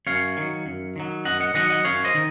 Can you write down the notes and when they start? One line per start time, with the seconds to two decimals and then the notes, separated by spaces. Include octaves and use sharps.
0.07 F#2 C#5 F5
0.37 D#3 F#3
0.66 F#2
0.96 D#3 F#3
1.25 F#2 D#5 F#5
1.40 D#5 F#5
1.54 D#3 F#3 D#5 F#5
1.70 D#5 F#5
1.85 F#2 C#5 F5
2.04 C5 D#5
2.15 D#3